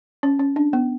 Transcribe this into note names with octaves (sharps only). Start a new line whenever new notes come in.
C#4
C#4
D4
B3